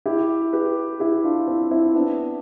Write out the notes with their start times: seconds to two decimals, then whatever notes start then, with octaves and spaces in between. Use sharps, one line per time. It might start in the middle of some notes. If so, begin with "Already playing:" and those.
0.06 E4 G4
0.53 G4 B4
1.00 E4 G4
1.24 D4 F4
1.47 C4 E4
1.71 C4 E4
1.94 B3 D4